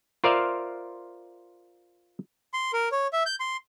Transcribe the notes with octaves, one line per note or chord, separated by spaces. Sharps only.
F4 A#4 C5 D5 E5 F5
C6
A#4
C#5
E5
G6
C6